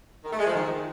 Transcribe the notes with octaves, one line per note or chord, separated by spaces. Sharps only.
D#3
A3
G#3
F3
D#3